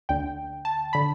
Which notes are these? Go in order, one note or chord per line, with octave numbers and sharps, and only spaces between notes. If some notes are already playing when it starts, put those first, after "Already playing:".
D2 D3 G5
A5
D3 B5